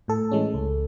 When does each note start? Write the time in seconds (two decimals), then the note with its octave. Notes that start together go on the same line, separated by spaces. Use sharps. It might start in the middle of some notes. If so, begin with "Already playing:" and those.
0.08 A2 A4
0.31 E3 G#3 C#4
0.54 C#2